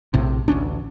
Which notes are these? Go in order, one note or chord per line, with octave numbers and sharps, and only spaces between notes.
A#1 A2 C3
A1 D2 C#4 D4